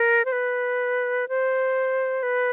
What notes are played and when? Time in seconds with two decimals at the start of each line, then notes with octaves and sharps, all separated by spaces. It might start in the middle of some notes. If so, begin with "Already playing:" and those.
Already playing: A#4
0.25 C5
0.32 B4
1.29 C5
2.23 B4